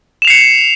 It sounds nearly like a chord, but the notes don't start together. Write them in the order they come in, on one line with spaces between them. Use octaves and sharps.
E7 F7 C7 C#7